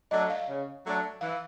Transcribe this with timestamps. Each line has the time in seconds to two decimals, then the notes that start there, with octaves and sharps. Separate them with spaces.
0.11 F#3 A3 D4 D#5
0.30 F5
0.48 C#3
0.85 F#3 A3 D4
1.21 E3 F5